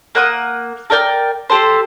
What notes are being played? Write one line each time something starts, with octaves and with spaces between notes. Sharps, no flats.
A#3 F#5 D#6
A4 A#4 D5 G5
G4 A4 C5